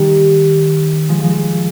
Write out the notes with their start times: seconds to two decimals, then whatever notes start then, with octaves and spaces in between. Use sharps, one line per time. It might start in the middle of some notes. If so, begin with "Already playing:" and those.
Already playing: D#3 G3
1.09 F3 G#3
1.24 F3 G#3